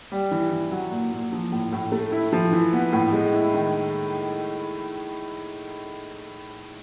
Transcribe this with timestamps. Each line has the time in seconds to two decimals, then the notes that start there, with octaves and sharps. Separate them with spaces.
0.12 G3
0.31 E3
0.52 E3
0.72 F#3
0.91 A#2
1.11 A#2
1.32 F3
1.52 A2
1.72 A2
1.92 A3
2.12 E4
2.32 F3
2.52 E3
2.73 B3
2.93 A2
3.12 G#3
3.33 E4
3.53 D#3